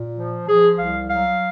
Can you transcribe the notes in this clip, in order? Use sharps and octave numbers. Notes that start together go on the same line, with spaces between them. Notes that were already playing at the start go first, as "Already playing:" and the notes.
Already playing: A#2
F3
F3 G#4
C2 F5
F#3 F5